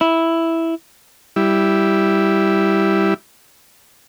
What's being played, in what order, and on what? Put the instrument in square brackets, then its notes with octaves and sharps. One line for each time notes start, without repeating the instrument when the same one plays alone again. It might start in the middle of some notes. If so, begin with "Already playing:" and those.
[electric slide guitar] E4
[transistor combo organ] G3 E4